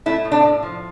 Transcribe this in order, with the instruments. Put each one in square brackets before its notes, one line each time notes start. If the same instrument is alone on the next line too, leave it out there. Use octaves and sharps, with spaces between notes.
[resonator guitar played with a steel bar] A3 E4
A2
D4
A2
F3